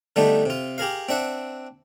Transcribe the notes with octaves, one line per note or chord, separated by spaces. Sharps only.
D3 G3 A3 B3 D4 D#4
C3 F4
G4 G#4 A#4 F5
C4 D4 E5 F#5